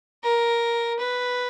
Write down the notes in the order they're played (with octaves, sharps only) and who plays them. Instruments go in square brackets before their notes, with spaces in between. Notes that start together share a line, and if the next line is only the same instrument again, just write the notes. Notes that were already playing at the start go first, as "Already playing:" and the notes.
[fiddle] A#4
B4